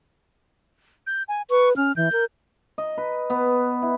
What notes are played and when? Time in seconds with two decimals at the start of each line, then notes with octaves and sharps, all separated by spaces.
1.07 G6
1.28 G#5
1.50 B4 C#6
1.77 C#4 F6
1.96 E3 G6
2.12 A#4
2.78 D#5
2.98 B4
3.30 B3
3.82 E4